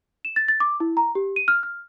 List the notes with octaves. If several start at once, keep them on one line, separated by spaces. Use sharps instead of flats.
E7
A6
A6
D6
E4
A#5
G4
D#7
F6
F6